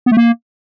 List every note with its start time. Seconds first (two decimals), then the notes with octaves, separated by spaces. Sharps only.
0.06 B3
0.12 A3
0.17 A#3